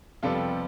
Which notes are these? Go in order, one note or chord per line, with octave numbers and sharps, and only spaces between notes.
F2 C3 G3 B3 F4 A4